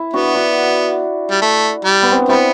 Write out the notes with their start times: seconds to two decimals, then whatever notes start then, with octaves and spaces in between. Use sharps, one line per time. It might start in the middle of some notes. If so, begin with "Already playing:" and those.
Already playing: E4
0.13 B3 D4 F#4
0.35 D4 F#4
1.31 G3
1.42 A3
1.85 G3
2.02 B3
2.11 C4
2.19 D4
2.28 G3 B3 C4 E4